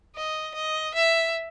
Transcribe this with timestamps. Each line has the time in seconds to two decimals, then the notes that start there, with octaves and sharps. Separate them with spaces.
0.16 D#5
0.55 D#5
0.95 E5